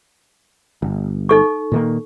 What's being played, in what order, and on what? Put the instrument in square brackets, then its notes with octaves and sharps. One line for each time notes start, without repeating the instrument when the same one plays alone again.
[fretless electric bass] G1
[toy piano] D#4 A4 C#6
[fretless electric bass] A#2 D#3 A#3